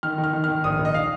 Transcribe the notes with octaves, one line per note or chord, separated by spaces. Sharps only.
D#3 F6
D#3
F6
D#3
F6
D#3
A#1 D#6
A#1
D#5
F5